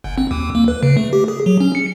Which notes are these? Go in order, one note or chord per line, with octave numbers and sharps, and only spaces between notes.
G1
C4
D#2
A#3
B4
C#3
A3
G4
G#4
F#3
C#4
C#7